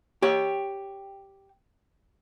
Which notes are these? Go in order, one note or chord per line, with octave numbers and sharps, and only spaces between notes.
G4 C#5